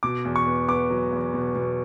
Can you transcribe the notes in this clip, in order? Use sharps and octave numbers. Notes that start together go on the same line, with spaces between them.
B2 D6
E2
C#6
B3
B3 D6
F#3
E2
B2
B2